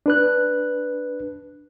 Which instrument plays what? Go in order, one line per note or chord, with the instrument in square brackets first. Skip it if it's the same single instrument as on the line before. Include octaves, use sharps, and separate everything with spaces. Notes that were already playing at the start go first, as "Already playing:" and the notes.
[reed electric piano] D4 B4 F#6